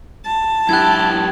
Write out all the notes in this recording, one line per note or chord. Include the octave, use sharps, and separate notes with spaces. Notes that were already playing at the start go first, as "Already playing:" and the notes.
A5
F#2 E4 G4 F#6 G#6